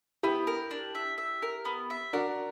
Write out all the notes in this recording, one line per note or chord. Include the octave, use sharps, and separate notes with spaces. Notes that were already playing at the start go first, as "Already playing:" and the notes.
B3 E4 G4
A#4
D4
E5
E5
A#4
B3
E5
D4 F#4 A#4